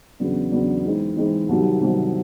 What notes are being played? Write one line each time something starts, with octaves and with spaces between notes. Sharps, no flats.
E2 C#3 F#3 B3 D4
E2 C#3 F#3 B3 D4
E3 G#3 C4 D#4
E3 G#3 C4 D#4
C2 C3 D#3 F#3
C2 C3 D#3 F#3